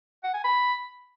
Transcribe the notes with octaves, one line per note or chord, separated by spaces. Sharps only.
F#5
G#5
B5